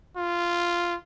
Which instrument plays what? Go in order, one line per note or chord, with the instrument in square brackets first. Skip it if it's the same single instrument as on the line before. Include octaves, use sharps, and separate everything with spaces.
[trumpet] F4